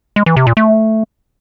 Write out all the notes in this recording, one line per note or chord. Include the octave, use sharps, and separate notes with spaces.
G#3
E3
C3
A#2
A3